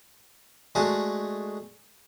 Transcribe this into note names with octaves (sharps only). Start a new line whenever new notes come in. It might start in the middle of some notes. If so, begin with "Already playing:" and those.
G#3 A3 D4 F#4 G#4 A4